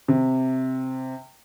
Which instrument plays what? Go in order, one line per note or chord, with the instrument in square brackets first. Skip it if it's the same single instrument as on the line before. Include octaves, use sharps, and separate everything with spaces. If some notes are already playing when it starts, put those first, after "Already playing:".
[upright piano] C3